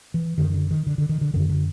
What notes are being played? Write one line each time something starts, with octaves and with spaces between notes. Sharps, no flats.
E3
F#2 D3 D#3
D3
D#3
D3
D3
D#3
D3
F#2 D3 D#3
D3